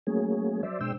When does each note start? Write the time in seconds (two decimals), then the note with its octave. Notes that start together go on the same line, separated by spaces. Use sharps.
0.07 F#3 A3 A#3 C#4 G#4
0.63 F#3 C5 D5 E5
0.81 B2 G#3 D4 C5 G5 E6